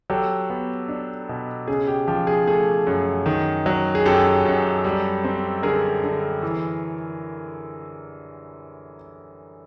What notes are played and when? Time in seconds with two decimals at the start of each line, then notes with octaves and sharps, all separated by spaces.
0.10 F#3 G4 A4
0.50 B3
0.89 D4
1.29 B2
1.68 C#3 G#4
1.87 G4
2.08 F3 G4
2.27 G#4
2.48 A3 G#4
2.87 F#2
3.26 D#3
3.66 F#3
3.95 G#4
4.06 F#2 G4 A4
4.45 F#2
4.85 G3
5.24 C4
5.63 D3 G#4 A#4
6.03 D3
6.42 E3